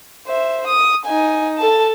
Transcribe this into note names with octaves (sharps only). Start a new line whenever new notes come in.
C5 E5
D#6
D#4 G#5
A4 A5